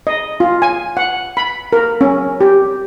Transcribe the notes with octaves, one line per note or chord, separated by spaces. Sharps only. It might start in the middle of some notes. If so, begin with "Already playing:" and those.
D#5
F4
G#5
F#5
B5
A#4
C#4
G4